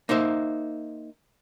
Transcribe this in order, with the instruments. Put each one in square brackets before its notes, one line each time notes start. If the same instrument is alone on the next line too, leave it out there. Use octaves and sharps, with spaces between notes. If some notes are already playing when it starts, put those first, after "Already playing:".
[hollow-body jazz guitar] A#3 D#4 C5 E5